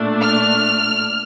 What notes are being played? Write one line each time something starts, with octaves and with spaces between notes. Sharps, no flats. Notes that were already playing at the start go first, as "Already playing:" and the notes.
Already playing: A#2 A3 D4
F6